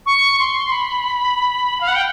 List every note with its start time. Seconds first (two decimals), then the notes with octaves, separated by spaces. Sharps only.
0.06 C#6
0.39 C6
0.72 B5
1.81 F5
1.88 F#5
1.95 G5